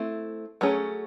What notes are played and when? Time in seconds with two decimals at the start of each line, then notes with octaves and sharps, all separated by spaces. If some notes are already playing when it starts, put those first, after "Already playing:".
Already playing: A3 C4 E4
0.61 F#3 A3 C#4 G#4